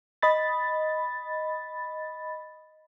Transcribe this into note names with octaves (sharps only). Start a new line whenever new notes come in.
D#5 B5 A6